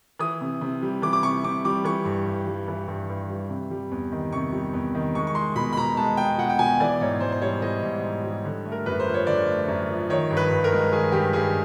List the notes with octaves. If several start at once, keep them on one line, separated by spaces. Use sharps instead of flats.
E3 D#6
C3
C3
G3
E3 D6
D6
C3 C#6
C3 D6
G3 D6
E3 C#6
G2
G2
G3
E3
G2
G2
G3
C3
G3
E2
D#3
C3 C#6
G3
E2
D#3
G#3 C#6
C#6
G#3 C6
B2 B5
B5
B2 A#5
G#3 A5
G#3 G5
B2 F#5
G5
B2 G#5
E3 D5
G#2 C#5
G#2 C5
C5
G3 C#5
E3 D#5
G#2
G#2
G3
D3
A3
A#4
F#2 B4
C5
F3
C#5
D3 D5
A3
F#2
F3
D#3 C#5
G2
B4
G2
A#4
G#3
D#3 G#4
G2 G4
G2 G#4